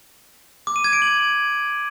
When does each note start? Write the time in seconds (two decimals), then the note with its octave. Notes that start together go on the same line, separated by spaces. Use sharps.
0.67 D6
0.76 D#7
0.84 G#6
0.93 D7
1.02 F#7